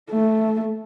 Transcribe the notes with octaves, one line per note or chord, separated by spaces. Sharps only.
A3